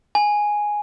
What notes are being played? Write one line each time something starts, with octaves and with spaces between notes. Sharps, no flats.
G#5